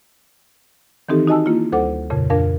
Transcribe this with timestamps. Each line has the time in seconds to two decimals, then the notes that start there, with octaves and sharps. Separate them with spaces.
1.09 D#3 E3 C4 D#4 G4 A4
1.28 D#4 F#4 D#5 G#5 A5 E6
1.46 A#3 E4 F4
1.72 D2 G3 A4 C5 F#5 D6
2.10 F2 A#2 C#3
2.30 F2 D4 A#4 F5